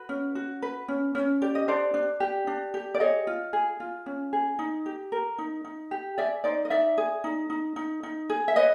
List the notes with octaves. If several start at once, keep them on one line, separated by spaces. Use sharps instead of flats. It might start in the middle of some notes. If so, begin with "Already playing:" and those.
Already playing: F#4 B4
C#4
F#4
B4
C#4
C#4
G4 D5
D#5
D4 C5 D5
D4
G4
D4
G4
D5
G#4 C#5 D#5
F4
G#4
F4
C#4
G#4
D#4
G4
A#4
D#4
D#4
G4
G#4 D5 E5
D#4 C5 D5
D#5
D#4 D5 E5
G#4
D#4
D#4
D#4
D#4
G#4
E5
B4 C#5 D#5